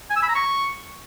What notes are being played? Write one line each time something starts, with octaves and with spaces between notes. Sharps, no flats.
G#5
E6
B5
A#5
C#6